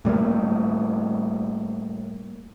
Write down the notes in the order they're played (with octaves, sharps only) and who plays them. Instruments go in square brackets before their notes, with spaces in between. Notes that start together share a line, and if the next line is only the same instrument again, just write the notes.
[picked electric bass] A2 G3 A3 A#3